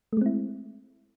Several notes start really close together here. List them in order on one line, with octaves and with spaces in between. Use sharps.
A3 G#3 C4 E4